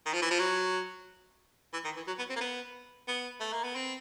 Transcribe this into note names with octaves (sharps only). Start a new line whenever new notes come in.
D#3
F3
E3
F3
F#3
E3
D#3
E3
F#3
B3
C4
A#3
B3
B3
A3
A#3
B3
C4